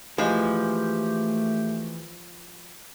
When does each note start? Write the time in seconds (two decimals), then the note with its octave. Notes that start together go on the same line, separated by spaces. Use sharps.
0.18 E3 F3 G#3 A3 G4